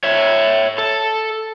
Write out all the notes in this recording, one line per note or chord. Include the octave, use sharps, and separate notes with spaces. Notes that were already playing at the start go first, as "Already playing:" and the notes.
C#5 E5
A4